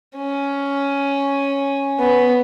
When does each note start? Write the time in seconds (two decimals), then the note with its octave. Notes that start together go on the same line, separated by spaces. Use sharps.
0.17 C#4
1.99 B3